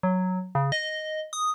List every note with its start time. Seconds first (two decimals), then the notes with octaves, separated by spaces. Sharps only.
0.03 F#3
0.55 C#3
0.72 D#5
1.33 D#6